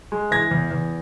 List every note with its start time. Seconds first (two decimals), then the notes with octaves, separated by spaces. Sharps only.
0.12 G#3
0.31 E3 G#6 A#6
0.51 E2
0.71 E2